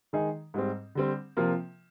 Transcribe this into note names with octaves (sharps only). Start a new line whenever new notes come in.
D#3 G#3 D#4 G#4
G#2 G3 C4
D3 G3 C4
C3 F3 A#3 F4